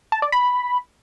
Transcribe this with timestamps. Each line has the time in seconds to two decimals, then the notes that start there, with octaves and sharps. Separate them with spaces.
0.12 A5
0.22 D5
0.32 B5